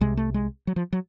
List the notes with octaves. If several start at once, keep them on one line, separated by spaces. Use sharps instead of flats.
C2 C3 G#3
A3
G#3
F#3
F3
F#3